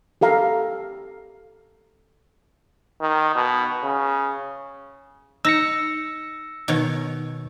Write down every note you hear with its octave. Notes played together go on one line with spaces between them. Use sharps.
G4 A4 F5 A#5
D#3
B2
C#3
D#4 E6 A#6 C#7
B2 D#3 C#5